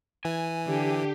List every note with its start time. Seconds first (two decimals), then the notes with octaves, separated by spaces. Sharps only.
0.25 E3 G#5
0.67 D3 G4